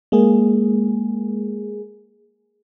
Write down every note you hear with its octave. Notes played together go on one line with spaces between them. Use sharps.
G#3 A#3 G#4